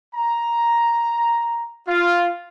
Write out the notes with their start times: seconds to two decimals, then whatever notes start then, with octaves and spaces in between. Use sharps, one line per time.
0.15 A#5
1.88 F4